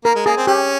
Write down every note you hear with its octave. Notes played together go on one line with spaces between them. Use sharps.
A#3 A#4
G#3
A#3 G#4
C4
C#4 G4